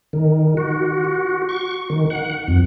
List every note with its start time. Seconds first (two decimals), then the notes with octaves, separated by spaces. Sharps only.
0.13 D#3
0.57 F#4
1.04 F#4
1.49 C#6
1.90 D#3
2.10 F#5
2.48 F2